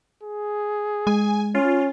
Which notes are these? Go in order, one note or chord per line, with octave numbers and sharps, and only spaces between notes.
G#4
G#3 G#5
C#4 F4